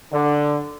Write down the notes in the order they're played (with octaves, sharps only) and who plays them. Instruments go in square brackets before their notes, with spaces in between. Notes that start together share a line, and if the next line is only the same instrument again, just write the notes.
[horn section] D3